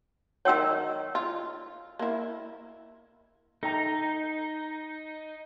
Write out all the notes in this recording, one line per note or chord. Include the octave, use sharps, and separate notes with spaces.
D#3 F#3 C#5 G5 E6
F4
A#3 E4
D#4 A4 G5 A#5